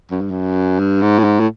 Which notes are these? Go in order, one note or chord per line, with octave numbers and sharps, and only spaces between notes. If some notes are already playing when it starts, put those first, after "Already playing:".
F#2
G2
F#2
G2
G#2
A2
G#2
A2